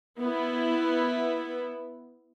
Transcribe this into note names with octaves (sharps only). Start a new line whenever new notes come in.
B3 E4